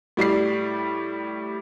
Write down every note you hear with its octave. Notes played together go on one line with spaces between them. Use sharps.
A2 G3 D5 C7